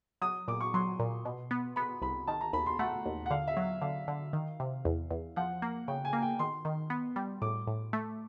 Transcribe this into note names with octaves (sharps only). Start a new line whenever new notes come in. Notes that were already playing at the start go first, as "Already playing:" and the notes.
F#3 D#6
A#2 D6
C#6
F#3 C6
A#2
B2
B3
B3 B5
C2 B5
D#3 A5
A#5
D#2 B5
C6
A3 F#5
D#2
F#5
D3 F5
E5
F#3
D3 F5
D3
D#3
C3
E2
E2
F3 F#5
A#3
C#3 G5
G#5
A#3
G5
D#3 C6
D#3
B3
G3
A2 D6
A2
A3